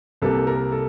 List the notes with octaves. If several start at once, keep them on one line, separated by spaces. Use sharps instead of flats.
C2 C3 G3 A#3 A4
A#4
A4